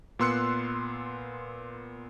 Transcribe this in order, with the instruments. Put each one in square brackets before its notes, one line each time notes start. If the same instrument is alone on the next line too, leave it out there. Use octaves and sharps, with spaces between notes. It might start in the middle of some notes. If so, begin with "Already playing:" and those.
[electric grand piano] A#2 B3 C6 E6 F#6 C#7